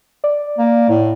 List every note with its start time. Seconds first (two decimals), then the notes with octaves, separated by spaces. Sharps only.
0.24 D5
0.58 A#3
0.89 A2